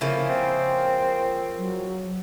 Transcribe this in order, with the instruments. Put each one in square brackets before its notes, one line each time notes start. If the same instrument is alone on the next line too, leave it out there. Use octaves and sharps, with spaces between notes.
[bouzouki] C#3 F3 A#3 [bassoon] E4
[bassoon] C4
[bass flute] F#3